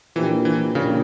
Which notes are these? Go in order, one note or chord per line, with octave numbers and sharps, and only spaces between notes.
A#2 E3 F3 A#3 D4 G4
E3
A#2 C#3 F3 A#3 D4 G4